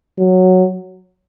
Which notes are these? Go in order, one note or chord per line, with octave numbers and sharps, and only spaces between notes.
F#3